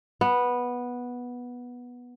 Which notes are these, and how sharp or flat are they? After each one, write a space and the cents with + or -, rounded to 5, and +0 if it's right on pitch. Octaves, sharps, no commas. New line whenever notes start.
B3 -10